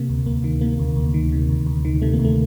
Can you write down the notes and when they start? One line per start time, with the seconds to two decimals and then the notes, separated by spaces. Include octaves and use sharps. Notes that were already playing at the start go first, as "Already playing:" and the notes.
Already playing: C3 A#3
0.09 D2
0.26 D2 A#3
0.44 D#3
0.61 C3 A#3
0.79 D2
0.96 D2
1.14 D#3
1.32 C3
1.49 D2
1.66 D2
1.85 D#3
2.02 C3 A3
2.13 A#3
2.19 D2
2.24 A3